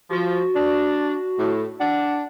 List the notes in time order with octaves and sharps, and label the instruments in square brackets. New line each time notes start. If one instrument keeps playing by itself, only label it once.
[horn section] F3 [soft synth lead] F#4
[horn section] D4
A2
[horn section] D4 [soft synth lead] F#5